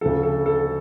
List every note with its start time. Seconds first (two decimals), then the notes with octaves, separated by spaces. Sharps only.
0.01 D2 C#3 F3 A4
0.23 A4
0.46 A4